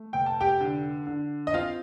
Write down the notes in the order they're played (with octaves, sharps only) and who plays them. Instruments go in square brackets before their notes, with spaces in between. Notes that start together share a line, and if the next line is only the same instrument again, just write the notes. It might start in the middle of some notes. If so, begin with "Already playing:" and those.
Already playing: [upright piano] A3
F1 G5
A5
G4 G5
D3
D3
D#5
C4 F4 F5